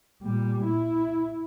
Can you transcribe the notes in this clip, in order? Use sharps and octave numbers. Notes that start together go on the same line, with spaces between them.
A#2 G3
E4